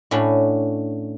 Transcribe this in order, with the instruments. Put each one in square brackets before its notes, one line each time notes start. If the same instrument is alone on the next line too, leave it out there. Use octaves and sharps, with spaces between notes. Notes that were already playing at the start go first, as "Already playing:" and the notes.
[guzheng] A2 C#4 D4 F#4